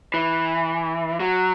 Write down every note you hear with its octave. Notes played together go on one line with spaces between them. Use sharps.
E3
F#3